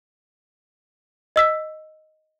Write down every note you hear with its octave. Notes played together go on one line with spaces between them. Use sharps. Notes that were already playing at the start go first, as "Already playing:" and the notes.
D#5 E6 B6